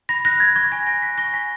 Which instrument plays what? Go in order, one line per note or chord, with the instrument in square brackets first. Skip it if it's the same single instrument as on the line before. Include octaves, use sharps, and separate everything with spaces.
[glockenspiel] B5 A#6
F#6 A#6
F#6 G#6
C#6 G#6
G#5 A#6
G#5 A#6
F#6 B6
C#6 A#6
G#5 B6